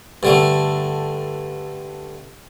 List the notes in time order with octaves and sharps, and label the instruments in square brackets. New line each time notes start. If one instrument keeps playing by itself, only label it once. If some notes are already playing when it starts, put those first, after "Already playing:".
[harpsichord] G2 D3 A3